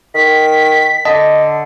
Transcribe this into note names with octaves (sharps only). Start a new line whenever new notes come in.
D#3 B6
D3 D#5 A5